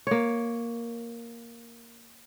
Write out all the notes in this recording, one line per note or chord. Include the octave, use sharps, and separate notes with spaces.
A#3 C#5